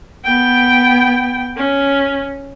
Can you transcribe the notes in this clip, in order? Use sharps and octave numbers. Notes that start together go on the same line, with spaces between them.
B3 G5
C#4